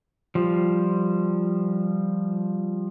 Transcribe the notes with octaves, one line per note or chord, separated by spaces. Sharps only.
F3 G3